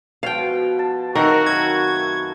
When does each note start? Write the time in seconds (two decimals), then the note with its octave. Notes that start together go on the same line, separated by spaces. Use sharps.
0.23 B2 F3 F5 G5
0.79 A5
1.15 D#3 A3 C4 E4 F#4 A#4
1.46 F#2 G#6